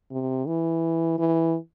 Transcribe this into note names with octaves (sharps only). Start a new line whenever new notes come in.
C3
E3
E3